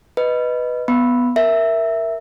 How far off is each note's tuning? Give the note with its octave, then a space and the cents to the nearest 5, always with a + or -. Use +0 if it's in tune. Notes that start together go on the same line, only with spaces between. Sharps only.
B4 +0 D#5 +0
B3 +0 B5 +0
A#4 +0 E5 +0